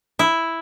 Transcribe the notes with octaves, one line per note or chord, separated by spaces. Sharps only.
E4